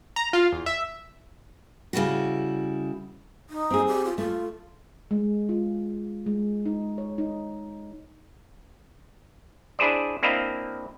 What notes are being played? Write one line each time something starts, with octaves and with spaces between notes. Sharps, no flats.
A#5
F4
E2
E5
C#3 G3 E4 F#4
D#4
C4 G#4
G4
F4
A3 F4
G#3
F4
G#3
D#4
C#5
D#4
D4 E4 G#4 C5 D5
A#3 C4 D4 E4 D#5 F5